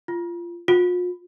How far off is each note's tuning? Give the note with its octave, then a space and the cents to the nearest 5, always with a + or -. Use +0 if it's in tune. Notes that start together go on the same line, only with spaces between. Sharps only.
F4 -20
F4 +40